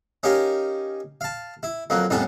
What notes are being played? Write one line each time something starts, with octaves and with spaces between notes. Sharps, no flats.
C#4 D#4 G4 A#4 F5
F5 A5
E4
F2 F#3 A#3
C2 F2 A2 B3 C#4 A5